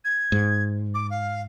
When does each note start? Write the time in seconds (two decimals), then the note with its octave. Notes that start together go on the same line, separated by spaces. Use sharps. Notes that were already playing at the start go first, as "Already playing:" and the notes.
0.04 G#6
0.32 G#2
0.94 D6
1.10 F5